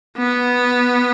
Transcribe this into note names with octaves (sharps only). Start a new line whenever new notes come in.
B3